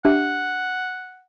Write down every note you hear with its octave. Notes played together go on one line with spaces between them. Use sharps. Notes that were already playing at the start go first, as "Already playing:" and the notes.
D4 G4 E5 F#5